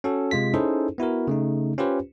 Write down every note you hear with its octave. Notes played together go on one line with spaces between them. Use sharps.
C#4 F#4 A4
C3 G#3 F4 B6
C#4 D#4 E4 G#4 A4 C5
B3 E4 F#4 A#4
C#3 A3 D#4
C#4 F4 G4 B4 C5